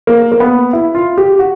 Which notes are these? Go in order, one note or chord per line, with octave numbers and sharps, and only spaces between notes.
A#3
A#3
B3
E4
F4
G4
F#4